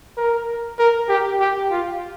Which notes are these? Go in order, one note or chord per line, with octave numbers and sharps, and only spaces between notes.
A#4
A#4
G4
G4
F4